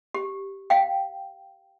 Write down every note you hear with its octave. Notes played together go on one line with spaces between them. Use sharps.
G4
F5 G5